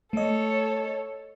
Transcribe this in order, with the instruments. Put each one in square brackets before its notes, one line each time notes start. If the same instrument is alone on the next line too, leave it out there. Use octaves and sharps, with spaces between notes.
[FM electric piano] A3 D#5 [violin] A4 C#5